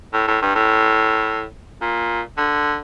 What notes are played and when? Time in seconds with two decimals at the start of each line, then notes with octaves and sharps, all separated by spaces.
0.14 A2
0.28 A2
0.42 G2
0.55 A2
1.82 A#2
2.38 D3